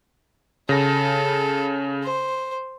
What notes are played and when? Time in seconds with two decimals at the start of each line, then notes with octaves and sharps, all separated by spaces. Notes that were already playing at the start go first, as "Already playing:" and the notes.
0.69 C#3 A4 A#6
2.04 C5